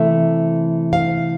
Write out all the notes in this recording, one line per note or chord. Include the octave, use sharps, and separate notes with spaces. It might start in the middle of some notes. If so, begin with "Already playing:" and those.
Already playing: C3 E3 A3 E5
F5